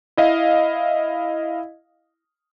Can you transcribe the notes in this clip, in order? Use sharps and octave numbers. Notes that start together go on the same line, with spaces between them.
E4 D#5 F5